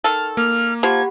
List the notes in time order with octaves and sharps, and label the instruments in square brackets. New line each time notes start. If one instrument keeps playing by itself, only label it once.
[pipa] D#3 A4 [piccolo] F6
[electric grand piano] A#3 [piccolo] F6
[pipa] F3 [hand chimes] G4 F#5 B5 [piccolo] G#6